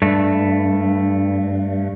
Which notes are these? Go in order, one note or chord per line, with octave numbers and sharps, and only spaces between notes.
G2 A3